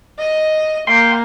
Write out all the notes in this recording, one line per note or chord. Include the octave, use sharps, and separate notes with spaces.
D#5
A#3 G5 C6